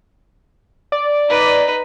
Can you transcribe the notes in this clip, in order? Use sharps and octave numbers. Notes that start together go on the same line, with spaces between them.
D5
D#4 B4